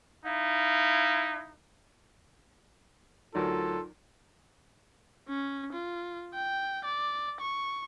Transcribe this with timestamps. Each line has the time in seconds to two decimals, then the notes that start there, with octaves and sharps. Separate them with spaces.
0.24 D#4 E4 F5
3.35 D2 F#3 D#4 F4 A4 A#4 D5
5.29 C#4
5.73 F4
6.34 G5
6.85 D5
7.41 C#6